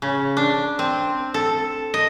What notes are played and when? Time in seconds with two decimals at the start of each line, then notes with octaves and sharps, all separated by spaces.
0.02 C#3
0.37 D4
0.79 C4
1.34 A4
1.94 D#5